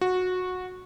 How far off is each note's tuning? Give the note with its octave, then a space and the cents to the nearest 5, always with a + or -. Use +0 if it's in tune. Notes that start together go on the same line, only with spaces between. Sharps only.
F#4 -15